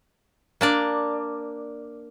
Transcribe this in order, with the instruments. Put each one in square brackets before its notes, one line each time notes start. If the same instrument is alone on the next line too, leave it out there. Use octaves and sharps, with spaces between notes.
[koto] A#3 D4 D5